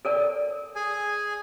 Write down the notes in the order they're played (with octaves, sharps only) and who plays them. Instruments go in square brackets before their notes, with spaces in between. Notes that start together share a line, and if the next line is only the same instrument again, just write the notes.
[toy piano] A4 A#4 D5
[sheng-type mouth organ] G#4 G#5